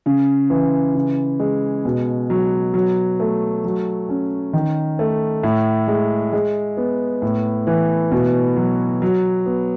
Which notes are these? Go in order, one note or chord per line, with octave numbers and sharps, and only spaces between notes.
C#3
E3
C#3
G#3
B2
F#3
F#3
A3
F#3
C#4
D#3
A3
A2
G#3
G#3
B3
A2
E3
B2
F#3
F#3
B3